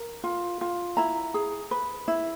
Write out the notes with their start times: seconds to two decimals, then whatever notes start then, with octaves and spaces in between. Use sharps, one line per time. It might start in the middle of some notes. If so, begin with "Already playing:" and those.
Already playing: A#4
0.24 F4
0.61 F4
0.97 E4 A#5
1.34 G#4
1.71 B4
2.08 E4